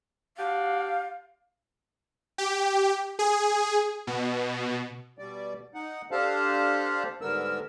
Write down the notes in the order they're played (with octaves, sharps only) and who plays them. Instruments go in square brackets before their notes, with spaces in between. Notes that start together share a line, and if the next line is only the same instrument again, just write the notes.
[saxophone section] D4 F#4 G4 [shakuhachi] F5
[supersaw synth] G4
G#4
B2
[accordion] B2 G3 D5
D#4 F#5
D4 G4 A4 C5 F5 A5
G#2 D3 G3 B3 A#4 E6